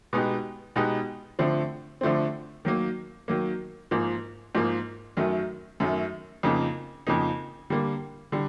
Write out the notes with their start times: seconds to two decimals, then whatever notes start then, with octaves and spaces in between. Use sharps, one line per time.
0.13 B2 G#3 B3 D#4 G4
0.76 B2 G#3 B3 D#4 G4
1.39 D3 F3 A3 C4
2.01 D3 F3 A3 C4
2.65 D#3 F#3 A#3
3.28 D#3 F#3 A#3
3.91 G#2 F3 A#3
4.55 G#2 F3 A#3
5.17 F#2 D#3 F#3 A3
5.80 F#2 D#3 F#3 A3
6.43 F2 C#3 F3 A#3 D#4
7.07 F2 C#3 F3 A#3 D#4
7.70 D3 G3 A#3
8.32 D3 G3